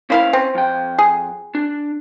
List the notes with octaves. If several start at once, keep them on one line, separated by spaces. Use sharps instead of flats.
A#3 C#4 E4 C5 F5
C4
F2 G5
G#4
D4